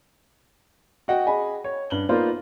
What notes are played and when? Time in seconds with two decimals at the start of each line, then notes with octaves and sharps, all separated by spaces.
1.08 F#4 D#5 F#5 G5
1.26 G#4 D#5 G#5 B5
1.64 C#5
1.90 G2 F#7 G7
2.09 A#3 B3 D#4 F4 C5 D5